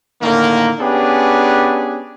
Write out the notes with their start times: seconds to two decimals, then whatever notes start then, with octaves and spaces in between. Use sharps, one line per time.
0.22 A2 D3 D#3 A#3
0.80 B3 C#4 D4 G4 G#4 B4